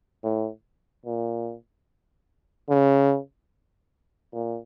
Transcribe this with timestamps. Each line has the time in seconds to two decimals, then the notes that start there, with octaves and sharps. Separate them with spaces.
0.24 A2
1.06 A#2
2.70 C#3
4.33 A#2